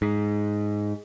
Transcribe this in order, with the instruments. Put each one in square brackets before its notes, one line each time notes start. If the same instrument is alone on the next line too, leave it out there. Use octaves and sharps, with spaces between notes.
[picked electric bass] G#2